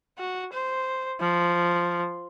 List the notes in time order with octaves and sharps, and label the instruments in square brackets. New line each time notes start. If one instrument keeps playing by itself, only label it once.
[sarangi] F#4
C5
F3